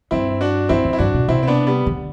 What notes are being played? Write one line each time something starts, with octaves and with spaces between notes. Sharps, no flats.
G2 C4 E4
D4 F#4
E2 C4 E4
F#2
E4
G2 D4 F#4
B2
C3 C4 E4
C4
B3 D4
G3 B3
D3